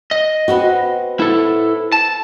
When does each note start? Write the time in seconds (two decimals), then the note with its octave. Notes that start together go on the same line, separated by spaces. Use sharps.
0.11 D#5
0.48 B3 C4 F#4
1.20 E4 A4
1.92 A5